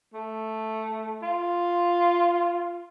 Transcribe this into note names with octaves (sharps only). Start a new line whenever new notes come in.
A3
F4